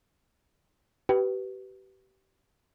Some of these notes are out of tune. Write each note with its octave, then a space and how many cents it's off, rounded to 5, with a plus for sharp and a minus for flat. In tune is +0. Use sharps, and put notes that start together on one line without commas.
G4 -30 B4 +0